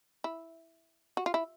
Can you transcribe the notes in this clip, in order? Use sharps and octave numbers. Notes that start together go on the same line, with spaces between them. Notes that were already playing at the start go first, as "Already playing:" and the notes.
E4
F#4
F4
E4